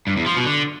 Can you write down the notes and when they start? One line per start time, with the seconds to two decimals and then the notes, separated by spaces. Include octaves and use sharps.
0.07 G2
0.16 E2
0.26 F3
0.36 B2
0.46 D3